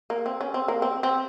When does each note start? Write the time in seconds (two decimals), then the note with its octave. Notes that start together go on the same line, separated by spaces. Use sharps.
0.10 A#3
0.26 C4
0.41 C#4
0.54 C4
0.68 A#3
0.82 C4
1.03 C4